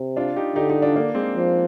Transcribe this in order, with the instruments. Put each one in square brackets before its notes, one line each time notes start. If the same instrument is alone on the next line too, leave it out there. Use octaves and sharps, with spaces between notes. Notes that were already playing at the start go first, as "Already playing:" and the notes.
Already playing: [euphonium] C3
[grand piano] D4 F4
D#4 G4
[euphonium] D3 [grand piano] D#4 G4
[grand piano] D#4 G4
D4 F4
A#3 D4
G#3 C4
[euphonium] F3